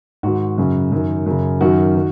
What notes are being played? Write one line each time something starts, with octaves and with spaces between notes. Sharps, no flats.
G#2 D#3 F#4
F#2 C#3
F#2 D#3
F#2 C#3
F#2 D#3 F#4
D#3